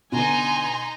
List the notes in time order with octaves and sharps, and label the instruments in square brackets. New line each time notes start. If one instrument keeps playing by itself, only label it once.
[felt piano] B2 D3 [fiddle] D#4 A#5 [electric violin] G#5 C6